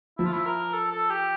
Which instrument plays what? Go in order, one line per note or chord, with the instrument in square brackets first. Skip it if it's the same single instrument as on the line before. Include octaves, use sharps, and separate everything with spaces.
[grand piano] F3 [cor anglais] E4
[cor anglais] F4
E4
A#4
A4
A4
G4